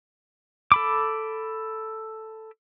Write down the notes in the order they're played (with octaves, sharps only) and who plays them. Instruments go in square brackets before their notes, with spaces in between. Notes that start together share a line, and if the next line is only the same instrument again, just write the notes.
[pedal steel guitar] A4 B5 D6